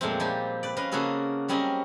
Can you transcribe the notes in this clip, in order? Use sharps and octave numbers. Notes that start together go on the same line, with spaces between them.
F2 A#2 F#3 G#3 A3 C4
F3 G3 D#4 G4 G#5
B4 D5
C#4 B4 D#5 F5
C#3 A#3 F#4 G#4 A4 B4
F#3 G3 C4 C#4 D#5